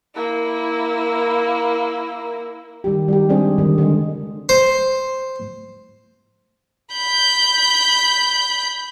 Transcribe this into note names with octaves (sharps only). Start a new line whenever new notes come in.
A#3 E4
D#3 G3 G4
G3 D#4 G4
G3 G#3 C4 D4 G#4
D3 D#3 G3
D3 G#3
C5
B5 G6